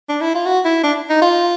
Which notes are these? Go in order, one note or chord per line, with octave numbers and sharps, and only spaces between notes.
D4
E4
F4
F#4
E4
D4
D#4
F4